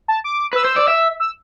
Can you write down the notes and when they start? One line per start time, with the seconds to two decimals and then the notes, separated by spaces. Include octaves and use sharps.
0.08 A5
0.24 D6
0.53 B4 E6
0.65 C5
0.76 D5
0.88 E5
1.20 E6